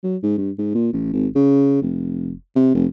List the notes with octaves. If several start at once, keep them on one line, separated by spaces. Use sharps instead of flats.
F#3
G#2
G2
G#2
A#2
A1
G#1
C#3
F1
C3
F1